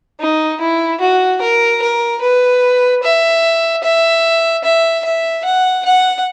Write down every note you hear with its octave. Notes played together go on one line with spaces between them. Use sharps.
D#4
E4
F#4
A#4
A#4
B4
E5
E5
E5
E5
F#5
F#5